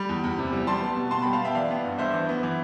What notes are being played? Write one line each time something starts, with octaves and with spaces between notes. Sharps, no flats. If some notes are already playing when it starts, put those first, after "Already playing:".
Already playing: G3 B5
E2
E2
C3
G3
G3 A5 C6
B3
B2
B2 A5 C6
G5 B5
G3
F5 A5
B3 E5 G5
E3 D5 F5
B3
G2
G2 C5 E5
E3
B3
E3